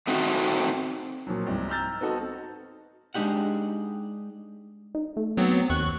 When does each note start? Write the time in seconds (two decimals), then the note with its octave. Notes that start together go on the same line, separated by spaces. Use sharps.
0.07 A3 C4 D#4 F#4
1.27 A#2 F3 F#3
1.46 C2 G#2
1.68 A#5 E6 F6 G6 A6
2.01 B3 C4 D#4 F#4 A4
3.14 G#3 D4 D#4 G4 F#5
4.95 D#4
5.17 A3
5.37 F#3 B3 C4
5.70 D#2 C#6 F#6